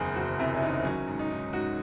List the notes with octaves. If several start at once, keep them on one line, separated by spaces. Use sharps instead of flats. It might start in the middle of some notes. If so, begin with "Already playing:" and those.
Already playing: F#1 E2 D#3 G#4 C5
F#1 F#4
C3 E4
C#4
D#3 D#4
F#3 C#4
G#2
D#4
G#2
G#2 F#4